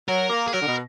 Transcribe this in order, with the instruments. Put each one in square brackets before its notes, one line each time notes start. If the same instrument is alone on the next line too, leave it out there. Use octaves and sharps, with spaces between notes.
[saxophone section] F#3 [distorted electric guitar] A#4
[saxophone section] A#3
[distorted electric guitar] G#4
[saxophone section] F#3 [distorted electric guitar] A#4
[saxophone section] D3
B2